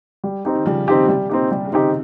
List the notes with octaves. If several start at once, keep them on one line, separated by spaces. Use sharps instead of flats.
G3
C4 D#4 G4
D#3
C#3 F3 G3
D#3 G3 C4 D#4 G4
A#2
C3 G3
A#2 C4 D#4 G4
C3 G3
C#3
C3 D#3 C4 D#4 G4